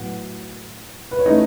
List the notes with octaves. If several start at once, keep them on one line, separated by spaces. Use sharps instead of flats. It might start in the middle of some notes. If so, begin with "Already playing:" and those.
Already playing: A2 F#3 B3 F#4 F#5
B4
C#5
E3 A3 C#4 D#4 D#5